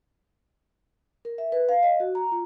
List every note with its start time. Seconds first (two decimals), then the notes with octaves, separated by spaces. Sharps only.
1.25 A#4
1.38 E5
1.52 B4
1.69 F5
1.83 D#5
2.00 F#4
2.15 A#5
2.32 F4